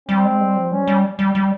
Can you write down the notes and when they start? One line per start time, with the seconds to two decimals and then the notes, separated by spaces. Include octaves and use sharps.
0.08 G3 C4
0.24 G#3
0.40 G3
0.56 F3
0.71 G3 C#4
0.81 F#3
0.87 G3
1.19 G3
1.35 G3